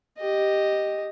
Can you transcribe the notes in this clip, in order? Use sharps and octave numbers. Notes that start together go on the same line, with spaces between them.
G4 D#5